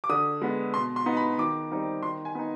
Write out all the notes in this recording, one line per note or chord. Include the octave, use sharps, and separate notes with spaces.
D6
D3 D#6
G#3 B3
B2 C6
C6
B3 D#4
B5
D#3 D6
G3 C4 D#4
D#3 C6
G#5
B3 D#4